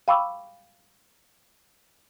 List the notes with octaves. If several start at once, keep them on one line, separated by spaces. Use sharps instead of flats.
F5 G5 B5 C#6 D6 E6